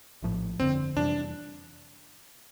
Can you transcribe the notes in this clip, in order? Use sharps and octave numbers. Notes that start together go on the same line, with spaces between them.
A#1 A2 F3
G1 F2 D3 C4
F2 C3 E3 G3 D4